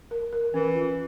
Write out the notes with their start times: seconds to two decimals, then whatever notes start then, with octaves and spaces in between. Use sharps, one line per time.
0.11 A#4
0.33 A#4
0.54 E3 C#4
0.75 F4